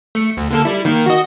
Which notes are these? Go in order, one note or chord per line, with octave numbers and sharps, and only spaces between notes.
A3 C#7
D2
D3 A#3 A4
G3 E4
D#3 A#3
F#4 D#5